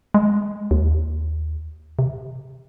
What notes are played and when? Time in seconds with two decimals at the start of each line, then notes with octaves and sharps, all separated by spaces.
0.14 G#3
0.71 D#2
1.99 C3